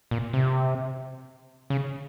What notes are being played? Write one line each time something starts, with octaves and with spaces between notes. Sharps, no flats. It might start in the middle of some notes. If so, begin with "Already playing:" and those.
A#2
C3
C#3